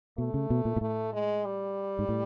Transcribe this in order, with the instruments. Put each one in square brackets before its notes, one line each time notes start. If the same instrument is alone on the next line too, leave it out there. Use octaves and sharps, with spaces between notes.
[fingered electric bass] B2 [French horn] A3
[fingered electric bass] C#3
B2
A#2
A#2
[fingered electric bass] A2 [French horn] A3
[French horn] G#3
G3
[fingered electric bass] G#2
A2